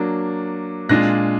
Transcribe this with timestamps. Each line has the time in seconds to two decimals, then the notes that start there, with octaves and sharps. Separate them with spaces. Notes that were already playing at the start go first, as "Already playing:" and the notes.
Already playing: F#3 A#3 D4
0.89 A#2 G#3 D4 F4 F#6 A#6